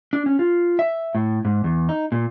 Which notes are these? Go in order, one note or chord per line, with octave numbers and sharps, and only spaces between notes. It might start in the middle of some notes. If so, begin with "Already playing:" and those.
D4
C#4
F4
E5
A2
G#2
E2
D#4
A#2